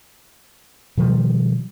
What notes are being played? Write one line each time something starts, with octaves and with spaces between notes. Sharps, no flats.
B2 D#3 F3 G3